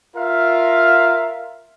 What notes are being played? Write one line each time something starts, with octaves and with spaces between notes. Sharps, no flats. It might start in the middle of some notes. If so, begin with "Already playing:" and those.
F4 A#4 E5 F5